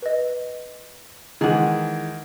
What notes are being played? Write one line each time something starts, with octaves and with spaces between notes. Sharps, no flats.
B4 D#5
D#3 E3 G#3 G#4 F#5